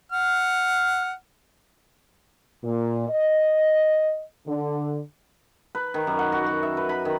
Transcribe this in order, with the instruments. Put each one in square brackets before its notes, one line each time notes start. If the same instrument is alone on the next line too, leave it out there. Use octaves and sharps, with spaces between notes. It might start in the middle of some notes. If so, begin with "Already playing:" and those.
[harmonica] F#5 F6
[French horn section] A#2
D#5
D3
[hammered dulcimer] B4
D#3
F#2
F#5
F#4
F#4
E5
B4
B5
D#3